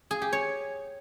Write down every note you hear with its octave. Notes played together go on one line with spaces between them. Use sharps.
G#4
G4
C#5